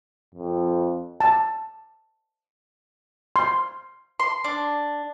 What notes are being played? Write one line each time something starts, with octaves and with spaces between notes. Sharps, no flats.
F2
A5
C6
C6
D4